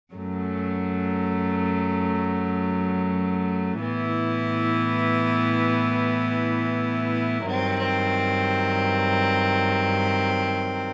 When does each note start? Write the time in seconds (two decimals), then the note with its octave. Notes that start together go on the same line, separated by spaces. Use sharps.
0.14 F#2 F#3 A3
3.81 A2 E3 B3 E4
7.47 G2 D#3 F#3 C4